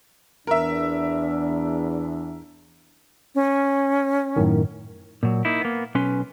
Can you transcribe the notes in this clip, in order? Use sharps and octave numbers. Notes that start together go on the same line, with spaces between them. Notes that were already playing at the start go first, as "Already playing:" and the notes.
E2 D4 A#4 E5
C#4
F#2 A2 D#3
A#2 F#3
A#3 D#4 E4
A#3 B3
B1 C#4 B4 C6